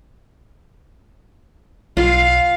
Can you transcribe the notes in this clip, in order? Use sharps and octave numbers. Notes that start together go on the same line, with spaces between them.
B1 F4 F5